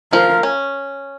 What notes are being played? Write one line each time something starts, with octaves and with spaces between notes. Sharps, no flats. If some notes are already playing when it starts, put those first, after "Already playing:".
F3 F4 A#4
C#4